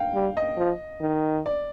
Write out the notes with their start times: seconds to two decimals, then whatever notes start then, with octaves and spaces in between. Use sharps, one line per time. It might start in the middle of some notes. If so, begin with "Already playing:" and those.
Already playing: F5 G5
0.14 G3
0.37 D#5
0.57 F3
1.01 D#3
1.46 D5